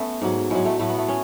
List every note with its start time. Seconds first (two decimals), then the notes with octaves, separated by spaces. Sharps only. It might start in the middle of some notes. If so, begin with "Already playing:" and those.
Already playing: A3 B3 C#4
0.22 G#2 F#3
0.50 A2 F#3 G#3
0.65 A3
0.79 A2 F#3 A3
0.90 B3
0.98 A3
1.08 C#4